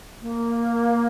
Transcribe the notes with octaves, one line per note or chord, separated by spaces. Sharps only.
A#3